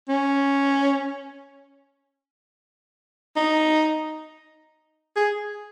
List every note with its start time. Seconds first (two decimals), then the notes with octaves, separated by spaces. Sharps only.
0.09 C#4
3.36 D#4
5.16 G#4